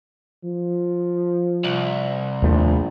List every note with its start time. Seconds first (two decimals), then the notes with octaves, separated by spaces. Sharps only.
0.44 F3
1.64 C2
2.42 A#1 D#2 A3